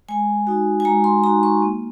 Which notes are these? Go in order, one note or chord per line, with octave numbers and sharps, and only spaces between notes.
G#3 G#5
D#4 F#4
G#5
G#3 A#5
C6
D#4 F#4 A#5
C#6
A#3